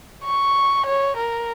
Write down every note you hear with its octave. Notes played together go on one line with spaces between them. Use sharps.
C#6
C#5
A#4